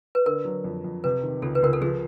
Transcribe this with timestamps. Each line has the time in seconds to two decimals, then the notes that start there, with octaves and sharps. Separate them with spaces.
0.15 B4
0.26 D3 A#4
0.45 F#3
0.64 F2
0.84 F2
1.04 C3 B4
1.23 D#3
1.42 C#2 A4
1.55 B4
1.62 C#2 A#4
1.73 A4
1.81 F3 G#4